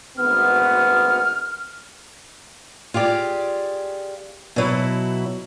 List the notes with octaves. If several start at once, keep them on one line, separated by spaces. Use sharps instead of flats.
G#1 D2 B3 F6
F4 G4 G#4 D5
B2 F#3 E4